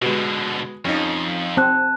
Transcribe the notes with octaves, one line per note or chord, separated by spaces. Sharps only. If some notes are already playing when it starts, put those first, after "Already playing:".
B2 D3 G#3 B3 F#4
F2 C#4 D#4
C4 A5 F#6